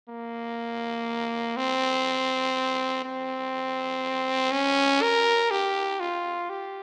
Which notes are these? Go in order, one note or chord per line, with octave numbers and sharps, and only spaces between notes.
A#3
C4
C4
C#4
A#4
G4
F4
G4